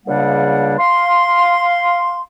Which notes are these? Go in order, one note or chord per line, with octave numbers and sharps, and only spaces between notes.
C#2 C#3 G3 A#3 D4 F#5
F5 C6